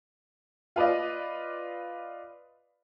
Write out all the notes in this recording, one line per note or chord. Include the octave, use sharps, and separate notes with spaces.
F4 B4 D5 D#5